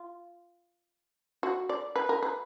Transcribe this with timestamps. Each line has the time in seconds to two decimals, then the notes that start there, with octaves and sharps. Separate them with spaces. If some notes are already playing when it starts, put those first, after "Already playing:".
Already playing: F4
1.43 F#4
1.69 D5
1.96 B4
2.09 A#4
2.23 B4